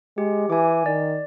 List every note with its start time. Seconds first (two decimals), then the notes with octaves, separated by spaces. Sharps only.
0.18 G#3 G4
0.50 E3 G#5 D6
0.86 D#3 D5